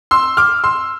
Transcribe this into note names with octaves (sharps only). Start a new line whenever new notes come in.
C6 E6
D6 F6
C6 E6